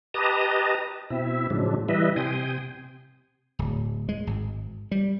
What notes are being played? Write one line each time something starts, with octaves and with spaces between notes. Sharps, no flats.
G4 B4 D#5 A5 A#5 D#6
B2 C4 E4 E5
A2 C#3 F3 F#3 G#3 D4
E3 G3 E4 B4 D#5 E5
C3 G5 G#5 C6 D#6
D1
G#3
G#1
G3